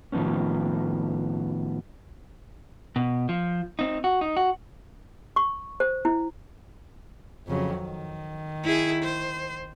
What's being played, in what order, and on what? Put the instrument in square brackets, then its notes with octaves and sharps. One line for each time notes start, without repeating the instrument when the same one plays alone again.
[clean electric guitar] A2 D#3 F3 B3 C#4
[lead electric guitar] B2
F3
C4 D#4
F#4
D#4
F#4
[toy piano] C#6
C5
E4
[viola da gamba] F2 C#3 F#3
D#3
[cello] E4 G#4
C5